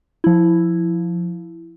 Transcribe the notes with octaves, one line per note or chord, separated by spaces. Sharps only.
F3 E4